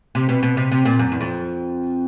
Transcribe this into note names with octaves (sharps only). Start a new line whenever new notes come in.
C3
B2
B2
C3
C3
A#2
F#2
E2
F2